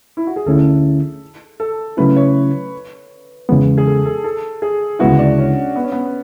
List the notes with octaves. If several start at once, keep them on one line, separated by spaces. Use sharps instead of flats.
E4
F#4
G#4
D2 D3 A3 C#4 E4 A4
A4
C#3 F#3 A3 C#4 E4 B4
C#5
E2 C#3 E3 G#3 B3
G#4
A4
A4
A4
G#4
D2 C#3 G#3 B3 E4 F#4
D4
C#4
B3
C#4
B3